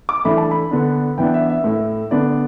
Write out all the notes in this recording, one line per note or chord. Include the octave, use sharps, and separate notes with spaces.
D6
E3 A3 D4 B5
A5
B5
D3 B3 D4
E3 B3 D4 G5
E5
E5
A2 A3 E4
D3 B3 D4 D5